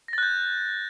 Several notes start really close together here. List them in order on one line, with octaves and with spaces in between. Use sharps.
A#6 A6 F#6 G6